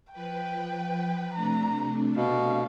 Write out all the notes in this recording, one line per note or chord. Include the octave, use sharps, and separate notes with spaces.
F3 B4 G5
C3 A3 D4 A#5
B2 F5